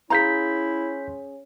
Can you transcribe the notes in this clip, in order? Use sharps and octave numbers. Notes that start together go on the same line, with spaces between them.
C#4 E4 G#4 F5 A#5 C6 G6 B6